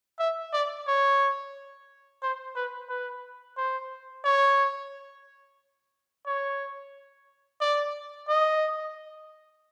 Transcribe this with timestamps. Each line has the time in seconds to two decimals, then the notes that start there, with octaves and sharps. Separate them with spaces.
0.19 E5
0.53 D5
0.87 C#5
2.22 C5
2.56 B4
2.89 B4
3.57 C5
4.24 C#5
6.26 C#5
7.61 D5
8.28 D#5